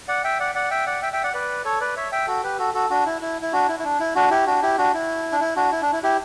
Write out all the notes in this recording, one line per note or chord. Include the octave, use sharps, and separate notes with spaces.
D5 F#5
E5 G5
D5 F#5
D5 F#5
E5 G5
D5 F#5
E5 G5
E5 G5
D5 F#5
B4 D5
A4 C#5
B4 D5
C#5 E5
E5 G5
F#4 A4
G4 B4
F#4 A4
F#4 A4
D4 F#4
E4
E4
E4
D4 F#4
E4
E4
D4
E4
D4 F#4
E4 G4
D4 F#4
E4 G4
D4 F#4
E4
D4
E4
D4 F#4
E4
D4
E4
E4 G4